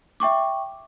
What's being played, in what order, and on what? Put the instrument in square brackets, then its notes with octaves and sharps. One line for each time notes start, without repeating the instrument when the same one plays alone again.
[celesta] E5 G5 C#6 D6